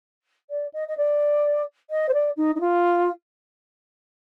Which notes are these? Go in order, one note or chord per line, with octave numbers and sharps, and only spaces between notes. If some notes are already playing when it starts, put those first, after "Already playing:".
D5
D#5
D#5
D5
D#5
C5
D5
D#4
D#4
F4